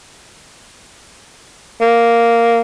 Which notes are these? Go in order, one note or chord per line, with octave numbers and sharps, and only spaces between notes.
A#3